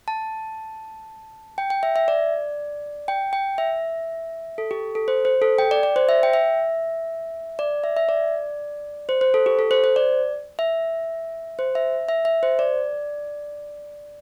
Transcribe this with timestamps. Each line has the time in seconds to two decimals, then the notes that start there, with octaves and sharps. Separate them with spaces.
0.08 A5
1.58 G5
1.70 G5
1.83 E5
1.96 E5
2.08 D5
3.08 G5
3.33 G5
3.58 E5
4.58 A4
4.71 G4
4.95 A4
5.08 C5
5.25 C5
5.42 A4
5.58 G5
5.71 D5
5.83 D5
5.96 C5
6.09 E5
6.23 G5
6.33 E5
7.59 D5
7.84 E5
7.97 E5
8.09 D5
9.09 C5
9.21 C5
9.34 A4
9.46 G4
9.59 A4
9.71 C5
9.84 C5
9.96 D5
10.59 E5
11.59 C5
11.75 E5
12.09 E5
12.25 E5
12.43 C5
12.59 D5